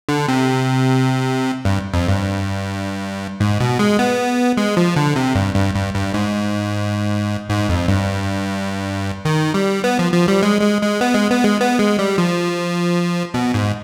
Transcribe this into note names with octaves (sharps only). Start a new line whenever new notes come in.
D3
C3
G2
F2
G2
G#2
B2
G#3
B3
G#3
F3
D3
C3
G2
G2
G2
G2
G#2
G#2
F2
G2
D#3
G3
B3
F3
F3
G3
G#3
G#3
G#3
B3
G#3
B3
G#3
B3
G#3
G3
F3
B2
G#2